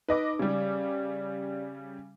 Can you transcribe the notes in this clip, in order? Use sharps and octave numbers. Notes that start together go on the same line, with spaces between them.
D#4 B4 D#5 D6
C#3 G3 G4 D5